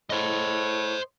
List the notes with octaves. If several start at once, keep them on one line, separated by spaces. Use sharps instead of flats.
A2 C5 D#5